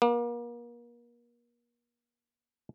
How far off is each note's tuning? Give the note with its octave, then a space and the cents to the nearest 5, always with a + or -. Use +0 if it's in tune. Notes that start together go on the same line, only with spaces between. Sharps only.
A#3 +35